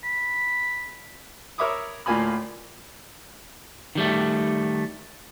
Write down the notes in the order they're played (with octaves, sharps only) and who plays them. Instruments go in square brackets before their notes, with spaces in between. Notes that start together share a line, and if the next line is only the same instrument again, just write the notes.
[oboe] B5
[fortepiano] A#4 C#5 E5 B5 D6 D#6
D2 A2 A#3 F4 G#5 B5
[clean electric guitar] D#3 G3 A3